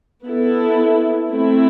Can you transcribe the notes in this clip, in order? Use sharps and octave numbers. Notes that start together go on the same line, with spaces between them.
B3 E4 A4
A3 C4 E4